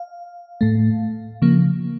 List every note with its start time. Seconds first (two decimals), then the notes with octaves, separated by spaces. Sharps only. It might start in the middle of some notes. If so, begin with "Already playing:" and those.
Already playing: F5
0.61 A2 A3
1.42 C#3 F3 A#3